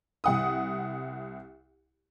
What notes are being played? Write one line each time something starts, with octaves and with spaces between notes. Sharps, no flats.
C2 F#5 D#6